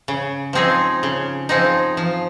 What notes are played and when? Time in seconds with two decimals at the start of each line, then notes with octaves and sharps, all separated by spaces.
0.08 C#3
0.53 F3 C4 D#4 G#4
1.03 C#3
1.49 F3 C4 D#4 G#4
1.97 F3